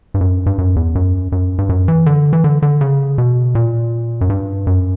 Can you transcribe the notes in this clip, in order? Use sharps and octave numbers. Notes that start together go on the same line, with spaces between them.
G2
F#2
G2
F#2
E2
F#2
F#2
G2
F#2
E3
D3
E3
D3
D3
C#3
B2
A#2
F#2
G2
F#2